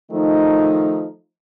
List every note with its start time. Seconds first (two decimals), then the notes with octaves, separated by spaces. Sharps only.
0.11 D#3 F3 A3 D#4